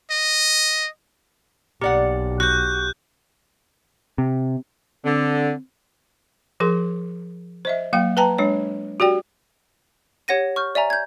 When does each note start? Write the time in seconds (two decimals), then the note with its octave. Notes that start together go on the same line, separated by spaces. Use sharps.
0.11 D#5
1.81 B1 A#3 G4 D5 F#5
2.40 F#4 F#6 G6
4.18 C3
5.05 D3 C4
6.60 F3 G#4 A#4 C6
7.65 C5 D#5 E5
7.93 F#3 A#3 F5 G5
8.17 B4 G5 A5 A#5
8.38 G#3 D4 C#5
9.00 F#4 G4 D5 G5
10.28 G4 C#5 F#5 A#6 D#7
10.56 C#6 F6 G6
10.75 D5 E5 G#5 A#5
10.90 G6 G#6